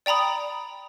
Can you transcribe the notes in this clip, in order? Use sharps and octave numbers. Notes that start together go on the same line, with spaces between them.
D5 G5 A#5 B5 D#6